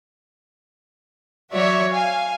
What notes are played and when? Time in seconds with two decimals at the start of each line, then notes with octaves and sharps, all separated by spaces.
1.53 F#3 F#4 C#5 D5 E5
1.92 F5 G#5